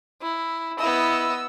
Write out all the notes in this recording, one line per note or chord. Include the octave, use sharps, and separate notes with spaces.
E4
B3 E4 D#5 E6